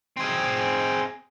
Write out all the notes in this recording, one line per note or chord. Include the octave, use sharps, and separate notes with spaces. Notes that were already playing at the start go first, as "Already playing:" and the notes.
C4 G#4